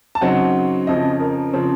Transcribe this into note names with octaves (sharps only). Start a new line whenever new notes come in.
A5
C#3 F#3 C4 D#4 F#5
F2 C#3 F3 D#5
A#4
C#3 F3 C4